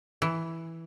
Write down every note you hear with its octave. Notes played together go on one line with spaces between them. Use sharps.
E3